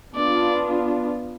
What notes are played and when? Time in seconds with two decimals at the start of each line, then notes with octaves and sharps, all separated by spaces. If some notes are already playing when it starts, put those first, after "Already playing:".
0.16 B3 D4 F4 D5